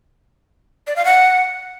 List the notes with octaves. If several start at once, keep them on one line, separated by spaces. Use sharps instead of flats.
D5
F5
F#5